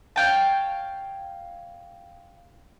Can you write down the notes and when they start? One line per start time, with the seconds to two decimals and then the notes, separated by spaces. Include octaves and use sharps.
0.16 C#5 F5 G5 A5